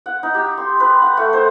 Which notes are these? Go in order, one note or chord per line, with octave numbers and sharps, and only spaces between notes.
F#5
D#4
G4
C6
B4
F#5
A3
C5